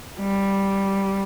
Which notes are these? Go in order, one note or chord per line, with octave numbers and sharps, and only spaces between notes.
G3